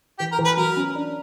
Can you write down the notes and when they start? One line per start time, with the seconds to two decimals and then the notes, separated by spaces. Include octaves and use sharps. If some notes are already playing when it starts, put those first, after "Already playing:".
0.19 E3 G4
0.32 A#4
0.39 E3
0.45 B4
0.57 F#3 A#4
0.77 C#4
0.95 D4